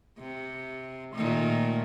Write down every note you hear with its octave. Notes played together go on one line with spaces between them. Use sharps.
C3
A#2 D#3 A3